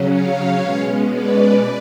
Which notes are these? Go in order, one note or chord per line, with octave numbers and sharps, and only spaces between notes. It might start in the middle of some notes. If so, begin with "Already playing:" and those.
Already playing: C#3 F#3 C#4
C#5 F5
B2 G#3 C#4
B4 D5